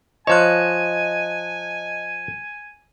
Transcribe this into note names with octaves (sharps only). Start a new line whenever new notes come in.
F3 C#5 D#5 G#5 A5 F#6